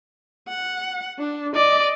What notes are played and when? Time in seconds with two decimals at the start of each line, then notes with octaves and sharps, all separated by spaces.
0.49 F#5
1.19 D4
1.55 D5 D#5 D6